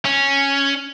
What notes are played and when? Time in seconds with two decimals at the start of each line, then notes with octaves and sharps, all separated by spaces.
0.05 C#4